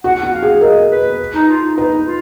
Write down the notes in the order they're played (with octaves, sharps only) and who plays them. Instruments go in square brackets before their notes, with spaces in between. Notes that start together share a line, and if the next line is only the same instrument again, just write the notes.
[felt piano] F#4 [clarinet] F#5
[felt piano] F#4
[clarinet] F5
[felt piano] G#4
[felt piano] A#4 [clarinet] D#5
[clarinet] B4
D#4
F4
D#4
[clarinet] D#4 [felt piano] B4
[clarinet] F4